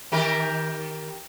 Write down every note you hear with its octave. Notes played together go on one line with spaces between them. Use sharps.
D#3 G4 A#4